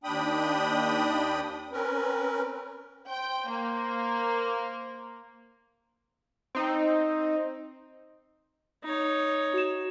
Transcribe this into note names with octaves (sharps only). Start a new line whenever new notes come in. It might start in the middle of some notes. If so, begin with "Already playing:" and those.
D#2 D4 G5 B5 D#6
C4 C#4 A#4 B4
C5 G5
A#3
C4 D#4
D#4 C#5
F#4 E7